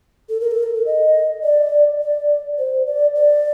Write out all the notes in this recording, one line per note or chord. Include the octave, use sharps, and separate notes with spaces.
A4
A#4
A4
A#4
A4
D#5
D5
D5
C5
D5
D5